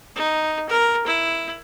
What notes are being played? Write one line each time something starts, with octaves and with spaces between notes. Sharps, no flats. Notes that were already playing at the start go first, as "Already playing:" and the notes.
D#4
A#4
E4